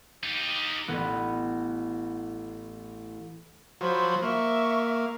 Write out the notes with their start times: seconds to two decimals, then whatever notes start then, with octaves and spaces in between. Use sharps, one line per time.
0.23 D#4 G4
0.88 A1 B3
3.81 F3 F#3 C5 B5
4.22 A#3 E5 C#6